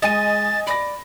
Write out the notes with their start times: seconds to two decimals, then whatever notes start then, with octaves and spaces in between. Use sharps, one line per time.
0.02 G#3 D#5 G#5 A6 D#7
0.67 D5 B5 A#6